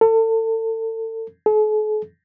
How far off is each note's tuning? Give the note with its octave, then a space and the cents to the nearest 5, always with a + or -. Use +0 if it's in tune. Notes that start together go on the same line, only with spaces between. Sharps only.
A4 +35
A4 -45